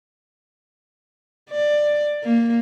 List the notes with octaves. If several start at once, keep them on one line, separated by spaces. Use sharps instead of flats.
D5
A#3